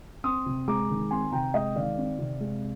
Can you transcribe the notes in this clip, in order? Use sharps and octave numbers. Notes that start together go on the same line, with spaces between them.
C4 C6 D#6
C3
G#3 A#5 D6
D#3
C4 G#5 C6
C3 G5 A#5
G#3 D#5 G5
D#3 D5 F5
C4
C3
G#3